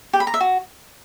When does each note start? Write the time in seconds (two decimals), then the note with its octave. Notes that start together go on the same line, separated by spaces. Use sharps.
0.13 G4
0.20 B5
0.27 A#5
0.34 E5
0.41 F#4